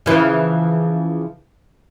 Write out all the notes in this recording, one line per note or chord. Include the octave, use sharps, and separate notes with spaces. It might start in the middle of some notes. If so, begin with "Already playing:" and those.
C#3 E3 F3